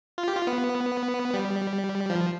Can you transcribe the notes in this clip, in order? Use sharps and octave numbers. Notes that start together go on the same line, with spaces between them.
F4
G4
F4
B3
G3
F3